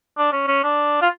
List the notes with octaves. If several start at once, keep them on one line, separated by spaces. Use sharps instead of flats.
D4
C#4
C#4
D4
F4